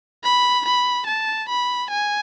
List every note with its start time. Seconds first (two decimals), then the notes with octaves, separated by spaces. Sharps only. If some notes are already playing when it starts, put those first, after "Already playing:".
0.24 B5
0.66 B5
1.07 A5
1.49 B5
1.91 G#5